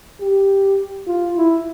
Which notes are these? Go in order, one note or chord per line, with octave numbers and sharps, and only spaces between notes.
G4
F4
E4